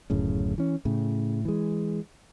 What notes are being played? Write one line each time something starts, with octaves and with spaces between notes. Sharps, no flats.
D1 F#2 A2 C#3
E3 C#4
A2 C#3
E3 G#3